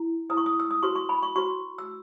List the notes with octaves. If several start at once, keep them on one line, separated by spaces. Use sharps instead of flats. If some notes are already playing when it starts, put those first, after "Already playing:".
Already playing: E4
E4 B4 D#6
C#6
D#6
E6
D#6
F#4 B4 C#6
C#6
B5
C#6
F#4 B4 C#6
E6